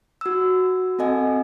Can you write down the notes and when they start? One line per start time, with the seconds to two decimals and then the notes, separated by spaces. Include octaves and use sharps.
0.21 F#4 E6
0.99 C4 A4 D#5 G#5